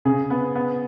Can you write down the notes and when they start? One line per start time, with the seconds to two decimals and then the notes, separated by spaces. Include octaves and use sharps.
0.05 C#3 G#4
0.30 B3
0.55 B3